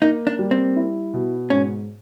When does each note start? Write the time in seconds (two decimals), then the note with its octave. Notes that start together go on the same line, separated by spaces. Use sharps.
0.02 A#3 D#4
0.27 D4
0.39 G3
0.51 C4
0.76 E4
1.14 B2
1.50 G#2 C#4